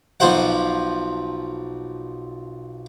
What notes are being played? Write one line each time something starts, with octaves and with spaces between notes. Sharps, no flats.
B1 F3 F4 C5 F#5